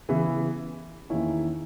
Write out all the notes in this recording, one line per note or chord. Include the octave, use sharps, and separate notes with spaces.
C#3 E3 B3 E4
E2 D#3 A#3 C#4 E4